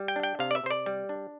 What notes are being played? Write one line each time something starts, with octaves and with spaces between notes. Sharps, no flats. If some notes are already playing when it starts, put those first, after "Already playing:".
Already playing: G3
G5
D4
G5
C3 F5
D5
E5
C3 C5
D5
G3
D4